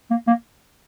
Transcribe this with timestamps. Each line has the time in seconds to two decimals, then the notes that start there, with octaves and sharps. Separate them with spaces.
0.10 A#3
0.27 A#3